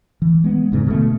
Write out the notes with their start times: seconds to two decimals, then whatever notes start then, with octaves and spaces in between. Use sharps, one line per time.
0.22 E3
0.44 G#3 B3
0.72 E1 G#2 C#3 B3
0.87 B2 D3 A3